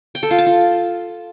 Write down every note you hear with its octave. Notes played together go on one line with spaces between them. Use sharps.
G5
A4
F4
A5
F4